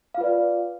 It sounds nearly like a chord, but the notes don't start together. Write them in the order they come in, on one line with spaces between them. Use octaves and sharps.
F5 F4 B4 D5